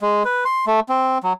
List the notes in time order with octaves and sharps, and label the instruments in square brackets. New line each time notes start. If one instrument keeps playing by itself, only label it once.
[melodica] G#3
B4
C6
A3
C4
F#3